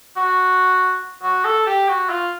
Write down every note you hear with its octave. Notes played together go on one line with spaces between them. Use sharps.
F#4
F#4
A4
G4
F#4
F4